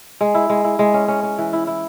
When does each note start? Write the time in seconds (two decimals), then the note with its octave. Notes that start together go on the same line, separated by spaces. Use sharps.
0.21 G#3
0.34 E4
0.49 G#3
0.64 E4
0.79 G#3
0.94 C#4
1.08 C#4
1.23 C#4
1.38 E3
1.53 E4
1.67 E4